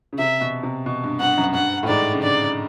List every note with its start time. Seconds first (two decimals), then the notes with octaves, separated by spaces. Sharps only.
0.13 C#3
0.19 C3 E5
0.41 B2
0.63 C3
0.86 B2
1.04 G2
1.20 G2 F#5
1.37 F#2
1.54 G2 F#5
1.83 A2
1.88 G#2 D5
2.14 C#3
2.23 D3 D5